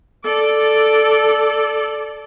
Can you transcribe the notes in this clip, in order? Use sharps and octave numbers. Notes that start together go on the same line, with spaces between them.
A4 D5